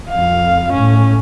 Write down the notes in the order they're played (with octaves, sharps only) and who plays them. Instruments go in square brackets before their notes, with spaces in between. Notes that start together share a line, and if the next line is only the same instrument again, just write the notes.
[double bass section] F2 [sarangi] F5
[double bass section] A2 [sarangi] C#4